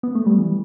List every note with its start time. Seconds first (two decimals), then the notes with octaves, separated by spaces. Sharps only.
0.03 B3
0.15 A3
0.26 G3
0.39 E3